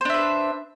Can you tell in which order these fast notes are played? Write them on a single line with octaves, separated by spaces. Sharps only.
C5 D4 E5 B4